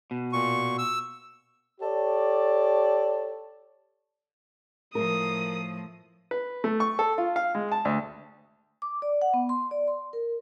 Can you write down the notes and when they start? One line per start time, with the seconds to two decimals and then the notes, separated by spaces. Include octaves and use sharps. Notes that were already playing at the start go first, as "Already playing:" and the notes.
0.11 B2
0.33 A#2 C#6
0.78 E6
1.80 G4 A4 C#5 D5
4.95 A2 F3 A#4 D#6
6.31 B4
6.64 A3
6.80 C#6
6.99 A4
7.18 F4
7.36 F5
7.55 G#3
7.72 A5
7.85 D2
8.82 D6
9.02 D5
9.22 F#5
9.34 B3
9.49 C6
9.71 D5
9.88 C6
10.13 A#4